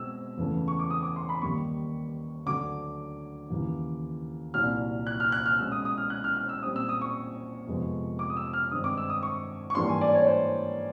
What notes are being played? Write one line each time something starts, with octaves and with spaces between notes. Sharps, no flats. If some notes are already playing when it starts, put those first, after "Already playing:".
Already playing: B2 G#3 C4 E6
E2 C#3 E3 A3
C#6
D6
D#6
D6
C6
B5
D#2 D#3 G3 A#3 C#6
D2 D3 F#3 D6
D#2 C#3 E3
C2 A#2 F#3 F6
F#6
F6
F#6
F6
B2 G#3 C#4 E6
D#6
D#6
F6
F#6
F6
F6
E6
A#2 G3 C4 D#6
E6
D#6
C#6
F2 C3 F3 G#3 B3
D6
D#6
E6
F6
G2 D#3 G#3 C4 D#6
D6
E6
D#6
C#6
C#6
G#2 E3 G3 A#3 D4 C6
G#5
D5
C#5
C5